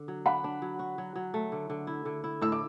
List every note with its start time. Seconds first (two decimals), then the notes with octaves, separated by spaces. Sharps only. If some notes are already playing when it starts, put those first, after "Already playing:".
Already playing: D3
0.08 F#3
0.26 D4 F#5 B5
0.44 D4
0.62 F#3
0.79 F#4
0.98 F#3
1.16 F#3
1.34 A3
1.52 D3
1.70 D3
1.87 E4
2.05 D3
2.24 E4
2.41 A2 E6
2.52 D6